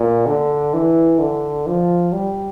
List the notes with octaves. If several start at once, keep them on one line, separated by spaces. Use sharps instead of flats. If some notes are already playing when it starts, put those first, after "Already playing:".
Already playing: A#2
D3
E3
D3
F3
G3